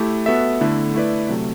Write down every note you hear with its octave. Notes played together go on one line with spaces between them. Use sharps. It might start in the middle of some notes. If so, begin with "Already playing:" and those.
Already playing: A3 E4 G4
B3 F#4 A4 E5
D3 A3 E4
A3 E4 B4 D5
C3 F#3 A3